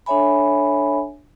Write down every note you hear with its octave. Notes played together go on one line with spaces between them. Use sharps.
D4 A4 C#5 E5 G#5 B5